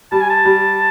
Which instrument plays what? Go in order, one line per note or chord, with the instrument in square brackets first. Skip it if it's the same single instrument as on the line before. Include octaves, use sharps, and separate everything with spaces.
[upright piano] G3 [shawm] A5
[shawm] G#5
A5
[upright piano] G3